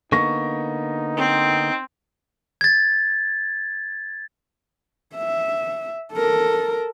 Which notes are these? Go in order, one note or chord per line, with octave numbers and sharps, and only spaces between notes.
D3 A#3 B3 D#4 C#6 A#6
C4
G#6 A6
E5
A4 A#4